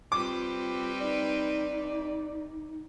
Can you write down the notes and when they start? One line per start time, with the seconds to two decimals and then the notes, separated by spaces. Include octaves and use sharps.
0.12 G3 C4 F4 B4 D6
1.01 D#4 D5